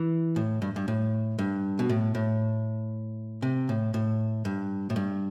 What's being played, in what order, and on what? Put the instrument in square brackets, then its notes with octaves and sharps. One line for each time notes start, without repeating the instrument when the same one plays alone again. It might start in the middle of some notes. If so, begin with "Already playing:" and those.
Already playing: [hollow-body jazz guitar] E3
A2
G2
G2
A2
G2
B2
A2
A2
C3
A2
A2
G2
A2
G2